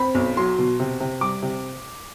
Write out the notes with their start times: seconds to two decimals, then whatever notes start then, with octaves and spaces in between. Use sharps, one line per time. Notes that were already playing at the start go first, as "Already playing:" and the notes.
Already playing: C4 B5
0.15 B1
0.37 F#3 C6
0.58 B2
0.80 C3
1.00 C3
1.21 G3 D6
1.42 C3